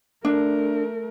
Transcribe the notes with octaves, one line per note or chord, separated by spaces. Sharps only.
A3 D4 A#4